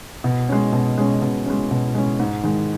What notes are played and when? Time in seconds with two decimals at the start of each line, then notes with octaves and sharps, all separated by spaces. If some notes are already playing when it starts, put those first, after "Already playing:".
0.24 B2
0.49 G#3 C#4
0.73 B2
0.98 G#3 C#4
1.22 B2
1.46 G#3 C#4
1.71 B2
1.95 G#3 C#4
2.19 G#2
2.43 D#3 G#3